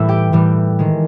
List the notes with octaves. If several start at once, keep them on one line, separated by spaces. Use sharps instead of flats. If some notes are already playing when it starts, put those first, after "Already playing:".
Already playing: A2 E3 G3 E4 E5
G4 G5
A2 E3 G3
D#3 G#3